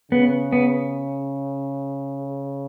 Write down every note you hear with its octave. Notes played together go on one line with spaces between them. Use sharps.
C#3 B3
B3